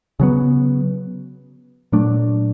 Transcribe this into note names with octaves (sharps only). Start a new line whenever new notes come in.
C#3 F#3 B3
A#2 F#3 A3 D4